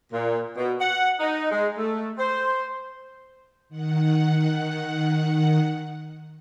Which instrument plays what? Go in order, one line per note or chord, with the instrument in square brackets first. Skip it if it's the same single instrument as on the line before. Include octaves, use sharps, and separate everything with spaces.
[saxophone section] A#2
B2
F#5
D#4
G#3
A3
C5
[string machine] D#3 F#5